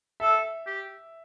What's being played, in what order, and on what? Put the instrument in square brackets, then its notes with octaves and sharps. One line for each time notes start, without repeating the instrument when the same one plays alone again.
[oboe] A4 [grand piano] E5
[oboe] G4